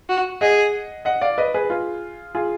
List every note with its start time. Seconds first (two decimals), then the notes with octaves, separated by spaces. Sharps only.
0.09 F#4
0.41 G#4 D#5 F#5
1.05 D#5 F#5
1.21 D5 F5
1.38 B4 D#5
1.54 G#4 B4
1.70 F4 G#4
2.35 F4 G#4